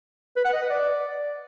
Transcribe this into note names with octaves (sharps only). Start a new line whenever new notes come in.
B4
F#5
D#5
B4
D5